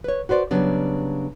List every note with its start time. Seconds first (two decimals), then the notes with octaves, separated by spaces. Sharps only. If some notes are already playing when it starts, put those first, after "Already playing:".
0.04 B4 C#5
0.29 F#4 B4 C5 D5
0.51 C#3 F#3 G3 B3 D4